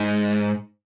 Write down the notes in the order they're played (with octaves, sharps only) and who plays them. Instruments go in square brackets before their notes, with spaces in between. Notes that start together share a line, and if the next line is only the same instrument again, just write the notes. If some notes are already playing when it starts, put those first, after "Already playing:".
Already playing: [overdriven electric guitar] G#2